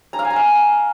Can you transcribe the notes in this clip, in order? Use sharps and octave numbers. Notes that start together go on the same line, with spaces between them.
A#5
F5
G#5
A#5
F5